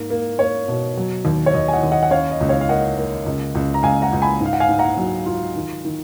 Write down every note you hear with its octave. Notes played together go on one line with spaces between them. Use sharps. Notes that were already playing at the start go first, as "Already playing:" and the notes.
Already playing: G#2 A#3
A#3
A#3 C#5
B2
F#3
D#2
C#5
D#2 D#5
G#5
D#5 F#5
D#2
D#5 F#5
F#5
C#4 C#5 F5
D#5
C#2
C#5 F5
F5
A#3 D#5 F#5
A#3
C#2
C#2
A#5
C#2 F5 G#5
F#5 A#5
C#2
G#5 B5
G#2 F5
F#5
F5 G#5
G#2
F#5 A#5
F#3
F4
D#3
D#3